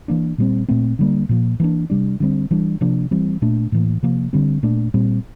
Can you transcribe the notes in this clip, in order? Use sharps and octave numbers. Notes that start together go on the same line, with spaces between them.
E3 A#3 D4
A#2 G3 C4
A#2 A3 C4
D3 G3 A#3
A#2 F3 A#3
E3 A#3 D4
C3 G3 D4
D3 G3 C4
E3 G3 D4
C3 F3 A#3 D4
E3 G3 C4
A#2 A3 D4
A2 E3 A#3
C3 F3 A#3
D3 G3 C4
A#2 A3 D4
A#2 G3 C4